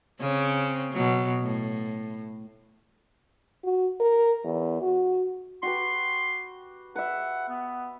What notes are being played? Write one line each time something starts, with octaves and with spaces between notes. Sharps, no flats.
C#3 C4 C#4
B2 F#3
A2
F#4
A#4
E2
F#4
F#4 G4 B4 C6
B4 E5 F#5
B3